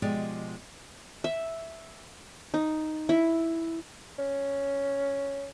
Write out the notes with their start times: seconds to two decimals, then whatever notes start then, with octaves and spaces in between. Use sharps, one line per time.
0.02 B2 F3 G#3 G4 D5
1.24 E5
2.54 D#4
3.09 E4
4.18 C#4